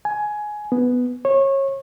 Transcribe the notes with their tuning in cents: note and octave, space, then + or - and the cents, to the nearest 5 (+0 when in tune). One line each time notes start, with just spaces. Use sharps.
G#5 +15
B3 +5
C#5 -25